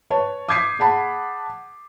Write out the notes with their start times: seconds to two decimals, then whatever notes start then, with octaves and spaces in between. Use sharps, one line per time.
0.10 B4 C#5 A5
0.49 D6 D#6 G6 G#6 B6 C7
0.79 G#4 F#5 A5 B5